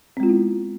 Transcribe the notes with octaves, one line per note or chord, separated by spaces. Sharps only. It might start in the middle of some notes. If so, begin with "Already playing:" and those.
G#3 B3 C4 E4 F4